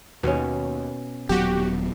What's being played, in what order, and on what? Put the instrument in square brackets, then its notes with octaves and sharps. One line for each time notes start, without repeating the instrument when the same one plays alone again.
[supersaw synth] D#2 [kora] B2 C#4
[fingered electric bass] D#1 F#3 B3 [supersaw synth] F#4 G4